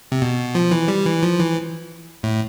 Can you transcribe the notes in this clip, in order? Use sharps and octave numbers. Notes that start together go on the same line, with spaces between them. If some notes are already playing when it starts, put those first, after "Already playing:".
C3
B2
F3
E3
G3
E3
F3
E3
A2